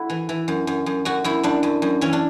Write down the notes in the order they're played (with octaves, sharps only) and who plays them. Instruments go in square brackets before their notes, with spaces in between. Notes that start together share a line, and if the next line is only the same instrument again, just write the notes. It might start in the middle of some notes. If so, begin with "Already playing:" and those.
Already playing: [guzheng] E4 F#4 A4
E3
E3
F#2
F#2
F#2
F#2 F#4
F#2 E4
F#2 D4
F#2
F#2
E3 C#4
D4